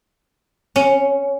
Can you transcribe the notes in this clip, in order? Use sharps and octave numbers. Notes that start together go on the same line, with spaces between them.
C#4